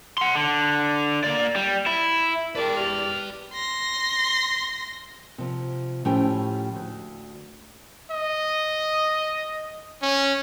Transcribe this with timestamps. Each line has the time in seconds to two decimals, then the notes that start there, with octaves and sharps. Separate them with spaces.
0.18 F#5 C6
0.35 D3
1.24 A#3 D5
1.56 G3
1.87 E4
2.55 E2 G2 A#4 B4 D5 G5
2.77 G4 F6
3.54 C6 A#6
5.38 C3 F3
6.05 A2 F3 C#4 E4 G4 G5
6.74 D2
8.11 D#5
10.02 C#4